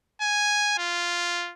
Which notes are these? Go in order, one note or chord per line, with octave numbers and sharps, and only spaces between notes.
G#5
F4